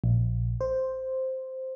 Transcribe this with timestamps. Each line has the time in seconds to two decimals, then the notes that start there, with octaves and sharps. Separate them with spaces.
0.04 A#1
0.61 C5